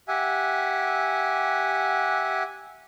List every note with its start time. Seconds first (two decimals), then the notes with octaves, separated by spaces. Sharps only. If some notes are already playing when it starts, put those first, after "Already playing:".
0.08 G4 E5 F#5 G#5